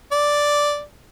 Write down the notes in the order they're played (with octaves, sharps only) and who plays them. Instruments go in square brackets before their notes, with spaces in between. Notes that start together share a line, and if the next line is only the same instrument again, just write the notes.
[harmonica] D5